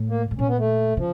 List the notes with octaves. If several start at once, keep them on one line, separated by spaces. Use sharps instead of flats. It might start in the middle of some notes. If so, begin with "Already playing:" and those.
Already playing: A2
A#3
A2
A#2 C#4
B3
A3
C#3 F3